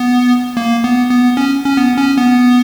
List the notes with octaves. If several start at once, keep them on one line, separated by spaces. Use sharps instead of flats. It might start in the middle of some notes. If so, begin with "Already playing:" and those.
Already playing: B3
A#3
B3
B3
C#4
C#4
B3
C#4
B3